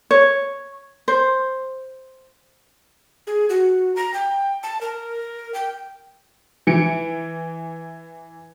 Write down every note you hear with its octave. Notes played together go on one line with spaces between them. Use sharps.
C#5
C5
G#4
F#4
A#5
G5
A5
A#4
G5
E3 C#7 D7